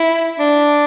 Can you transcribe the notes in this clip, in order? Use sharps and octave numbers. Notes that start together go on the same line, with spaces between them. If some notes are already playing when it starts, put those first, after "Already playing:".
Already playing: E4
D4